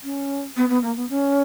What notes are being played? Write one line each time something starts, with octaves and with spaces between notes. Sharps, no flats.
C#4
B3
B3
A#3
B3
C#4